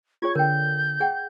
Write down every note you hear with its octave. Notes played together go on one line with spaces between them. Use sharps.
F4 G#4 C#5 C#6 G#6
D3 A#4 G5 G6
G#4 F#5 G5